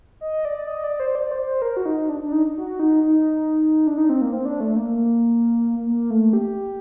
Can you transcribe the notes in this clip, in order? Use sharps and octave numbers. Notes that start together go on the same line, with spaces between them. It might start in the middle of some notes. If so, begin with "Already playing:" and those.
D#5
D5
D5
D#5
D5
C5
D5
C5
C5
A#4
F#4
D#4
D4
D4
D#4
F#4
D#4
D#4
D4
D#4
C4
A#3
C4
D4
A3
A#3
A#3
A3
G4